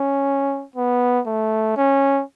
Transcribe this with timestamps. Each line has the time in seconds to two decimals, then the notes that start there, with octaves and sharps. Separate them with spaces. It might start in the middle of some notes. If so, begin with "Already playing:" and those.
Already playing: C#4
0.75 B3
1.27 A3
1.77 C#4